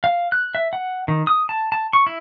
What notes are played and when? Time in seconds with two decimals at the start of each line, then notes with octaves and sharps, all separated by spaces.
0.04 F5
0.32 F#6
0.55 E5
0.73 F#5
1.08 D#3
1.27 D#6
1.49 A5
1.72 A5
1.93 C#6
2.07 E4